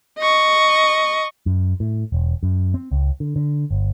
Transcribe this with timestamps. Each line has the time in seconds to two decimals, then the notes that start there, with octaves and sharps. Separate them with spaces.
0.18 D#5 C#6
1.46 F#2
1.80 A2
2.12 E1
2.43 F#2
2.74 C4
2.92 C#2
3.20 D3
3.36 D3
3.71 G1